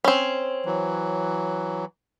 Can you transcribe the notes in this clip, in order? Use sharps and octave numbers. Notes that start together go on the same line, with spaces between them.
C4 C#4
E3 F#3